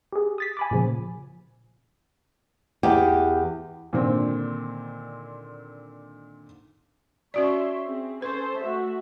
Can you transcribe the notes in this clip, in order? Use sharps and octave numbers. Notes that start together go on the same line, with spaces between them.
G4 G#4
D#6 A6 B6
G#5 B5 D6
A#2 C#3 F3
E2 G4
A#2 D3 D#3 C4
C#4 F#4 C#5 D5 E5 C6
C4 G#4
C#4 A4 B4 C5
A3 F#4 E5